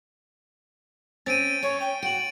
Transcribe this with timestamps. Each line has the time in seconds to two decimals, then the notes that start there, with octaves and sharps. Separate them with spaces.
1.26 C4 C#4 A6 D7 D#7
1.63 C#4 C#5
1.80 G5
2.02 F#4 D7 F#7